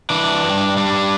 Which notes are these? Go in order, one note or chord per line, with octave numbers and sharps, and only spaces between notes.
E3 D4
G2
G3 D4